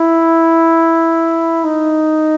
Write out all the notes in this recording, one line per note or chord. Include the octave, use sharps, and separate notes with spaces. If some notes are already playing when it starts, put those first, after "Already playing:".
Already playing: E4
D#4